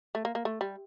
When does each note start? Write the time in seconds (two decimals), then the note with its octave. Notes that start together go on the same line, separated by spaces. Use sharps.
0.15 A3
0.25 A#3
0.35 A#3
0.45 A3
0.61 G3